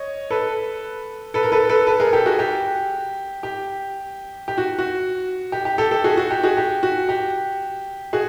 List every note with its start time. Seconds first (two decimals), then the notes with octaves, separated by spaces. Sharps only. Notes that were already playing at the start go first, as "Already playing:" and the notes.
Already playing: C#5 D#5
0.31 A4 B4
1.34 A4 B4
1.43 A#4
1.52 A4 B4
1.69 A4 B4
1.87 A4 B4
2.00 G#4 A#4
2.13 G4 A4
2.26 F#4 G#4
2.39 G4
3.43 G4
4.48 G4
4.58 F#4
4.79 F#4
5.52 G4
5.65 G4
5.78 G4 A4
5.91 G4 A4
6.04 F#4 G#4
6.17 F#4
6.31 G4
6.44 F#4 G#4
6.57 G4
6.83 F#4
7.09 G4
8.13 F#4 G#4